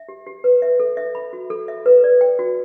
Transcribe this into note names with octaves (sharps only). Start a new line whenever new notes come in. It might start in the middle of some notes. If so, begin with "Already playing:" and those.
Already playing: E5
G4
G4
B4
E5
A4
E5
B5
F#4
A4
E5
B4
D5
G5
F#4